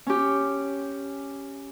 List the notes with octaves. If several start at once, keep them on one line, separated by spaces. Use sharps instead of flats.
C#4 G4